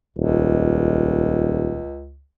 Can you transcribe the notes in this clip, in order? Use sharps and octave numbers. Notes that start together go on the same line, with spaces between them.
D#1 C#2